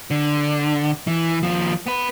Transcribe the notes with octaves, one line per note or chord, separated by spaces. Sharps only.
D3
E3
D#2 F3
B3 B4